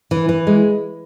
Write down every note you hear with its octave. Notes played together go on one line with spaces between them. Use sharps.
E3
E3
G#3